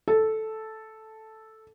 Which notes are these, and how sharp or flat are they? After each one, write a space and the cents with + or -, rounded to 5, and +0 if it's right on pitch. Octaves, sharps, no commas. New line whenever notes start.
A4 -5